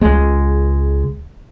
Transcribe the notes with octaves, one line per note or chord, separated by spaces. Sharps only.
C#2 G#3